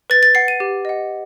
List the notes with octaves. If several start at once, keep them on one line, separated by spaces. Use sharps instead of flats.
B4 A6
A6
F#5 C7
D#7
G4
D#5 F#5